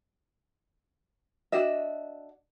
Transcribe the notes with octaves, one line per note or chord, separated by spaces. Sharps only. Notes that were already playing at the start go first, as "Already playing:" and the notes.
D4 F#4 D#5 E5